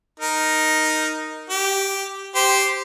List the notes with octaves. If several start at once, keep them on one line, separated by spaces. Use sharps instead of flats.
D#4 A#4
G4
G4 C5